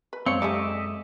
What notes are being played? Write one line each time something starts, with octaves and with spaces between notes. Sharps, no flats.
B4
F#2 G#3 C4 C#5 D5 F5 C#7
G3 A3 G#4 D#5 E5 D6